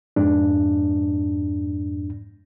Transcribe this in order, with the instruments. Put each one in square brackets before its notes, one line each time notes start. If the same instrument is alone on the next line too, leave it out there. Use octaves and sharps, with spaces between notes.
[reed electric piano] F2 G#2 D4